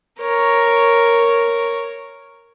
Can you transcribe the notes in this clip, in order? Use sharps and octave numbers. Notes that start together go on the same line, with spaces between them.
A#4 C#5